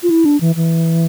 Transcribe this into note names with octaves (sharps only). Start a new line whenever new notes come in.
F4
E4
D4
E3
E3